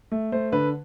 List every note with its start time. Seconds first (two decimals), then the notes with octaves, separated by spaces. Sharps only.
0.12 A3
0.32 A3 C5
0.52 D3 B4